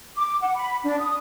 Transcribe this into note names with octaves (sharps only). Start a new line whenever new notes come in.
D6
F#5
B5
D4
D#6